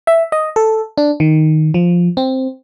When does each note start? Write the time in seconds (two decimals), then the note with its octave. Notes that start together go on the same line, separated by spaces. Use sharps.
0.07 E5
0.32 D#5
0.56 A4
0.98 D4
1.20 D#3
1.74 F3
2.17 C4